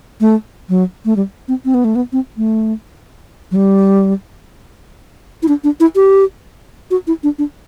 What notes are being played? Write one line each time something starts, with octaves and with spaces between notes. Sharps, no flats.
A3
F#3
A3
G3
C4
C4
B3
A3
B3
C4
A3
F#3
G3
E4
D4
D4
E4
G4
F#4
E4
D4
D4